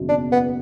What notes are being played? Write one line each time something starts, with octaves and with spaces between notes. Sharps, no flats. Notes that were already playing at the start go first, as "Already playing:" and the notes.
Already playing: F#1 E2 B2 F#3
D4
B3